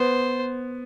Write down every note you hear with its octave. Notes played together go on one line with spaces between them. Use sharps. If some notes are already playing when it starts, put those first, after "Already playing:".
Already playing: B3 C5